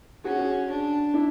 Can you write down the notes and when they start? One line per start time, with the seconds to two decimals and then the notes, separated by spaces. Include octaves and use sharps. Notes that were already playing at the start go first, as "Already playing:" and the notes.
0.24 C#4 F#4 G#4
0.39 F#4 G#4
0.69 D4
1.14 D4 E4